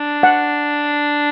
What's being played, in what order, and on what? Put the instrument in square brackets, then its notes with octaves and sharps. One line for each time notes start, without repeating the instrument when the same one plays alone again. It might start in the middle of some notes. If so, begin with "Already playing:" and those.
Already playing: [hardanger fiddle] D4
[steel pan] F#5